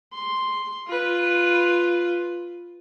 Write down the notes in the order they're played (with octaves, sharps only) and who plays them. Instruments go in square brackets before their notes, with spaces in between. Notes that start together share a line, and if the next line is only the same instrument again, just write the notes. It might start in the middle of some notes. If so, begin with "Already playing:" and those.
[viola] C6
F4 B4